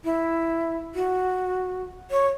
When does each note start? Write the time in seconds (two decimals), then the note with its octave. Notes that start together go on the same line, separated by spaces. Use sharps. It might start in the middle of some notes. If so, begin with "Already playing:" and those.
0.04 E4
0.95 F#4
2.11 C#5